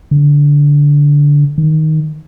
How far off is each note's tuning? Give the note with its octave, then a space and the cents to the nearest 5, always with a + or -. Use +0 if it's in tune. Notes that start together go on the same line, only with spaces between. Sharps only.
D3 -15
D#3 +5